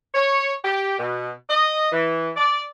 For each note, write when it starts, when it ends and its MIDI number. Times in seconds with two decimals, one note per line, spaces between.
0.14 0.52 73
0.64 0.95 67
0.98 1.30 47
1.49 1.89 75
1.92 2.30 52
2.36 2.62 74